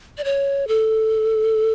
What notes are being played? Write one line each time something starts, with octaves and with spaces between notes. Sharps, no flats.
D5
C#5
A4